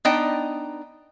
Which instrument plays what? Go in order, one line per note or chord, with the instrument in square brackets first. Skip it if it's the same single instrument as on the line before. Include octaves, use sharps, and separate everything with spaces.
[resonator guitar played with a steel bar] B3 D4 D#4 D#5 G5